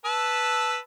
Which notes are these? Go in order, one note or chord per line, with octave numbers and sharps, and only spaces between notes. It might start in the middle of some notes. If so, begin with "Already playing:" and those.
B4 A5 E6